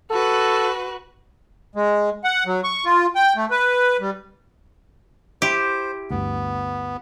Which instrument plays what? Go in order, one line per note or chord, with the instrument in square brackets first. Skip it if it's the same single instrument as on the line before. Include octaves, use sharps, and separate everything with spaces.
[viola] F#4 B4 [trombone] A4
[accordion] G#3
F#5
F#3
C#6
F4
G5
A3
B4
G3
[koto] E4 G4 [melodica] C5
[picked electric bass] G1 D2 [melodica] B3